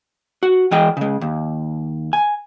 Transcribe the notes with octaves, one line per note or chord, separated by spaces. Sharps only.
F#4
E3 G#3 G#4 D#5 G5
C#3 G#3
D#2
G#5